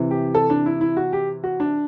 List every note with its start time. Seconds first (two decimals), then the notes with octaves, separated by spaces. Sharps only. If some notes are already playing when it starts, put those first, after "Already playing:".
Already playing: C3 E3
0.11 G4
0.35 A4
0.50 D4
0.66 E4
0.81 E4
0.97 F#4
1.13 G4
1.44 F#4
1.60 D4